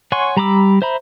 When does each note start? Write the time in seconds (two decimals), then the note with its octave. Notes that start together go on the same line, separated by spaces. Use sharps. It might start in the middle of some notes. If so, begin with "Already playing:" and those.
0.12 C#5 F#5 G#5 C6 C#6
0.37 G3 A#5 B5 D6 E6
0.82 C5 E5 A#5 B5